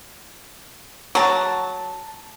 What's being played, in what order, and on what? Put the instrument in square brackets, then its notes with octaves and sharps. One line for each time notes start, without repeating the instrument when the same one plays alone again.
[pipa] F#3 [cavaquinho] A5 A#5